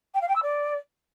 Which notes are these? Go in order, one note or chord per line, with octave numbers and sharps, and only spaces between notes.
G5
F5
G5
E6
D5